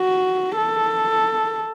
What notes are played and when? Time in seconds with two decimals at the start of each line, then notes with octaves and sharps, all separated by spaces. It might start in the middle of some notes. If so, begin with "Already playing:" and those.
Already playing: F#4
0.57 A4